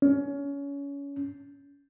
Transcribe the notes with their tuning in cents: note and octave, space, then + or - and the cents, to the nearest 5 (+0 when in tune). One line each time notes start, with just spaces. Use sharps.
C#4 +25